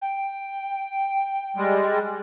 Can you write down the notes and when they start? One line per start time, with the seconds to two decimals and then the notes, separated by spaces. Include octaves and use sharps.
0.01 G5
1.57 G3 G#3